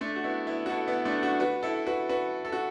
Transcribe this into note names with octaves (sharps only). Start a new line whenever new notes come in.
A3 D4
F#4
B3 E4
B3 E4
F#4
E4 A4
B3 E4
A3 D4
D4 F#4
F#4 B4
E4 A4
F#4 B4
F#4 B4
A4
F#4